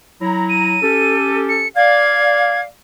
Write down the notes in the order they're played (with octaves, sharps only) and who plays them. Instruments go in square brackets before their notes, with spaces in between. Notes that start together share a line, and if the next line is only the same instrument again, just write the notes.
[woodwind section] F#3 E4 A#5
[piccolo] D#7
[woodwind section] C#4 G4 A4
[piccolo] C#7
[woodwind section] D5 F5 [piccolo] G#6